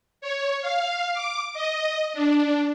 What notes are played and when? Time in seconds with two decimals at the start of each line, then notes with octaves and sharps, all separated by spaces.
0.21 C#5
0.62 F5
1.14 D6
1.54 D#5
2.14 D4